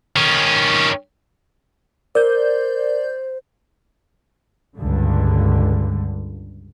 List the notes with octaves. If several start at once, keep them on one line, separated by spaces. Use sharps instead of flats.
D#3 C#4
A#4 C5 D5 G6
C#2 G2 D3